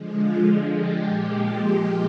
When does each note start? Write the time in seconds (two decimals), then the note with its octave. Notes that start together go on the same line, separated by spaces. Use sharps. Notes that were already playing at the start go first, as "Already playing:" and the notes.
Already playing: D3 F3 G#3
0.18 F4
0.46 D3 F3 G#3
0.75 G4
1.03 A#2 F3 G#3 G4